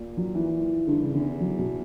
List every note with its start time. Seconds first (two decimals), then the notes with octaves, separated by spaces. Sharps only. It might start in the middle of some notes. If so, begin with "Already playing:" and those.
Already playing: A#2
0.17 F#3
0.35 E3
0.87 G2 D3
1.01 C#3
1.14 E2 D3
1.41 F#3
1.58 B2